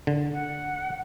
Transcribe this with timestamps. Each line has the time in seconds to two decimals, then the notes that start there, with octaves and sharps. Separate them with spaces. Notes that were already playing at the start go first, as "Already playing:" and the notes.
0.07 D3
0.33 F#5